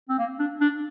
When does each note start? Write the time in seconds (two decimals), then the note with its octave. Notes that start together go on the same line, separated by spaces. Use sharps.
0.09 C4
0.18 A#3
0.39 D4
0.61 D4